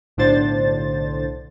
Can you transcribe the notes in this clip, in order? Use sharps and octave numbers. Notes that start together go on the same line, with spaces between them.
B1 A2 D3 D4 C5 A6